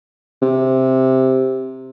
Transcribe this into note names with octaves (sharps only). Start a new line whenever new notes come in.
C3